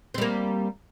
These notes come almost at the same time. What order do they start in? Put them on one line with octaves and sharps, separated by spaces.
C4 G3 A#3